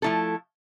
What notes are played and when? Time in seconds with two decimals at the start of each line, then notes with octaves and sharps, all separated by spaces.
0.02 F3 A3 E4 A4